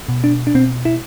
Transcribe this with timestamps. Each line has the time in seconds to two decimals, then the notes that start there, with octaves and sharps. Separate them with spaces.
0.08 B2
0.24 D4
0.47 D4
0.55 B2 C4
0.85 E4